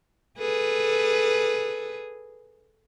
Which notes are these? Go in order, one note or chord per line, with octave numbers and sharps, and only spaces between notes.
G#4 A4 B4